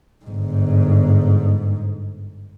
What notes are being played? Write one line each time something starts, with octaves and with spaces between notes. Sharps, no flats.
G1 G#2